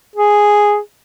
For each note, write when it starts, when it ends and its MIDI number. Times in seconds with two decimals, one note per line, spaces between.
0.15 0.78 68